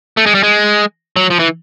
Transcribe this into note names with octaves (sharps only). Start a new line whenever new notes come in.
A3
G#3
G3
G#3
F#3
F3
E3